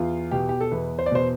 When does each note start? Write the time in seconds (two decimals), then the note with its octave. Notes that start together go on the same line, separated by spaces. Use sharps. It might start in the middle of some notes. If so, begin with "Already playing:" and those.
Already playing: E2 F4
0.31 B2 G4
0.49 G4
0.61 A4
0.71 E2 B4
0.99 C5
1.06 D5
1.11 B2 C5